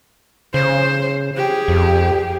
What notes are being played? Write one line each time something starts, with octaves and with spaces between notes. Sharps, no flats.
C#3 C5
G4 G#4
F2